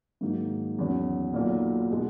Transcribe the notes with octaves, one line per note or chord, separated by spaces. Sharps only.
G#2 D#3 F#3 A#3 D#4
F#1 E2 D#3 F#3 C#4
B1 A#2 F#3 A#3 D#4
B2 G#3